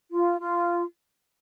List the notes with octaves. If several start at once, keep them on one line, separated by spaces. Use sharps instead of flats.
F4
F4